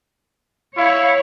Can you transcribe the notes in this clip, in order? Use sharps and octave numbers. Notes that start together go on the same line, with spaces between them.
E4 C#5 F5